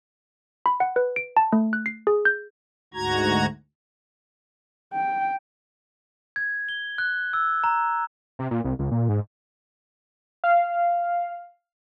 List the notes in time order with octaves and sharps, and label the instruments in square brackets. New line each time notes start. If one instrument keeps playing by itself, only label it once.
[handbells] B5
F#5
B4
D7
A5
A3
F#6
C7
G#4
G6
[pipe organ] D2 G#2 F#4 A#5 G#6
[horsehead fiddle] G5
[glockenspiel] G#6
G7
F#6
E6
A#5
[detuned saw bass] C3
A#2
C2
C#2
A#2
G#2
[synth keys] F5